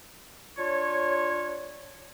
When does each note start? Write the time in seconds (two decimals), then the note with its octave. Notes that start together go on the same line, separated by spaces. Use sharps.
0.58 D4 F4 C#5